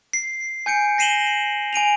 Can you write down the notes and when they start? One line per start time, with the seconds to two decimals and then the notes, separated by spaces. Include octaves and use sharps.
0.13 C7
0.66 G#5 G6 C#7 D7
0.98 A#6 C7 D#7 E7 F#7 G7
1.73 G#5 D7 D#7 F7